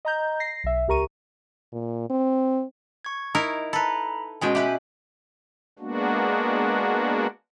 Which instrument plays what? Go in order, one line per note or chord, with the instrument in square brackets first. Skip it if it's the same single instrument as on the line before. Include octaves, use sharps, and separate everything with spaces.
[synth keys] D#5 A#5 G6
A#6 C7
B1 E5
C#2 G4 A#4 A#5 C#6 D#7
[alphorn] A#2
C4
[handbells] C#6 G#6
[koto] D#4 E4 A#4
[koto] A4 B4 [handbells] A#5 B5
[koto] B2 G#3 G5 [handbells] C#4 F#4 G#5
[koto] G4 B4 [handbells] E5 G#5
[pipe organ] G#3 A#3 B3 D4 F#4